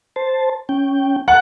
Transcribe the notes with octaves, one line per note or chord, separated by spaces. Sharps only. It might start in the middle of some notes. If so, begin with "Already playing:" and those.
C5 A5
C#4 G5
F#5 A5 F#6